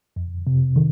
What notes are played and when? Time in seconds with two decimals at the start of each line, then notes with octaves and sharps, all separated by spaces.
0.16 F2
0.47 C3
0.76 D#3